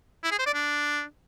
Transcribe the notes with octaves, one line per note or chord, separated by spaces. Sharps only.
E4
G#4
C5
D5
D4